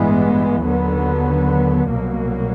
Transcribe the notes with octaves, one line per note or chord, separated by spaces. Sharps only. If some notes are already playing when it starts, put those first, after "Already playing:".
Already playing: A1 G2 E3 G#3 B3
D#2 D3 F#3 B3
C2 B2 F#3 A#3